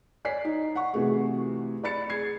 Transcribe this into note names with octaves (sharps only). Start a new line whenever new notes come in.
C#5 D5 G#5 B6 C7
D#4
F#5 C#6
C3 E3 A3 F#4 G#4
D5 B5 A6 C#7
G#4 G#6 C7